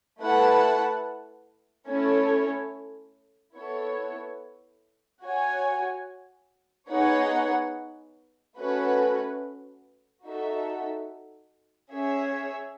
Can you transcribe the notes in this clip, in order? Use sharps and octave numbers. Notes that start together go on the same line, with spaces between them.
A3 E4 B4 F#5 A5
A3 C#4 E4 A4 C#5
B3 E4 A4 C#5
F#4 C#5 G#5
B3 D#4 G#4 C#5 F#5
A3 C#4 F#4 B4
D#4 F#4 A4 E5
C#4 G#4 C#5 E5